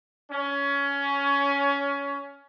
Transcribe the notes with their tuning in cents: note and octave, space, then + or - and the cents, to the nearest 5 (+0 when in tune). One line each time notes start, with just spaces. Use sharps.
C#4 +20